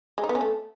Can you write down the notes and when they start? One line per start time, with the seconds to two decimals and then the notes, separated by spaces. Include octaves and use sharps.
0.18 G#3
0.24 D#4
0.29 B3
0.35 C#4
0.41 A3